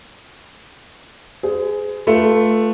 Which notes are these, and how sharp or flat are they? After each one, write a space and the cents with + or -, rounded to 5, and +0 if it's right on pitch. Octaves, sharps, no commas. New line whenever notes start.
G#4 +10 C5 -40
A3 +0 F4 +0 B4 -15